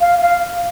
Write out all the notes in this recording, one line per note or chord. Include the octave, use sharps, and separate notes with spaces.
F5
F5